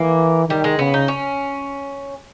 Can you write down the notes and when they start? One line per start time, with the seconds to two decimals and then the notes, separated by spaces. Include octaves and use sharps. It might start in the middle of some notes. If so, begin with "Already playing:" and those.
Already playing: E3 A#3
0.49 D#3 G3
0.64 G#3
0.78 C#3 B3
0.94 D#4
1.08 C#4